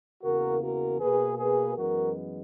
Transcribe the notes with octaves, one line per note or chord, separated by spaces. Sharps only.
E2 C#3 E3 A#3 F#4 A#4
F#4 A#4
B2 A#3 G#4 B4
G#4 B4
F#2 E3 G#3 B3 F#4 A#4